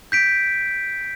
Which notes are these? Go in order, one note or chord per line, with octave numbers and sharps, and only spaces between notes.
G6 B6 D7